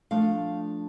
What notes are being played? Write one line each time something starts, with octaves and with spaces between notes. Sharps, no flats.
F3 A3 D4 F5